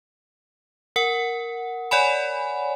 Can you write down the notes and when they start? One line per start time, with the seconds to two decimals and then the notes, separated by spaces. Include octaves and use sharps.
0.96 A#4 F#5
1.91 C#5 D5 F#5 G#5 B5